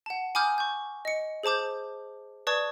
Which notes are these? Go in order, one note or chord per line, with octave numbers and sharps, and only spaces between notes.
F#5 A5
G#5 B5 D6 D#6 F6 G6
C#6 G6
D#5 C#7
G#4 C5 A5 D6 G6
B4 D5 A5 C#6 D#6 G#6